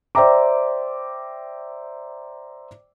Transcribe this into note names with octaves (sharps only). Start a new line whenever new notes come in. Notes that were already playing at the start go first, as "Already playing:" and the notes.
C5 D5 E5 G5 A#5 D6